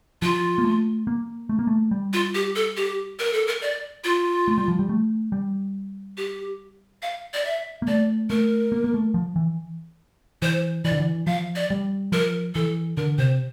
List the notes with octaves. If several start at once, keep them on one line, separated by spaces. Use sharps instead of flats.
F3 F4
A#3
A3
A#3
A3
A#3
A3
G3
F4
G4
A4
G4
A#4
A4
A#4
D5
F4
A3
G3
F3
G3
A3
G3
G4
F5
D5
E5
A#3
A3 D5
A3 A#4
A#3
A#3
A3
F3
E3
E3 C5
E3 D5
D3
E3
F3 F5
D5
G3
F3 A#4
E3 A4
D3 A#4
C3 C5